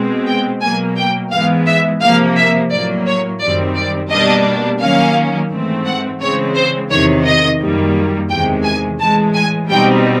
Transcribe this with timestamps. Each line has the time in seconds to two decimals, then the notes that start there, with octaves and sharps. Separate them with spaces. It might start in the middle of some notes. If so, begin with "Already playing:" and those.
Already playing: B2 G#3 C4
0.27 G5
0.62 B2 F#3 A#3 G#5
0.97 G5
1.32 G#2 E3 G#3 B3 F5
1.67 E5
2.02 C3 F3 A#3 F5
2.37 E5
2.71 A2 F#3 A#3 D5
3.06 C#5
3.41 F#2 D#3 G3 C4 D5
3.76 D5
4.11 B2 G3 A#3 D4 D#5
4.81 D#3 F#3 A#3 C#4 F5
5.51 G#2 E3 A3 C4
5.86 F#5
6.21 C#3 E3 G#3 C4 C#5
6.56 C5
6.90 E2 C3 D#3 C#5
7.25 D#5
7.61 F#2 D#3 G3 A#3
8.30 E2 C3 D#3 G#3 G5
8.65 G#5
9.00 A2 E3 G#3 A5
9.35 G#5
9.70 B2 G3 C4 D#4 G5